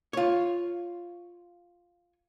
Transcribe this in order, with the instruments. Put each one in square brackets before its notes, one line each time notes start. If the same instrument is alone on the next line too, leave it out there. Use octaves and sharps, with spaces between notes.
[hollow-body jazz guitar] F4 C#5